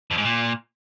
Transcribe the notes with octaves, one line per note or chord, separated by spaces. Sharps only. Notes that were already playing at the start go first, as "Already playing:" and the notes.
F2
G#2
A#2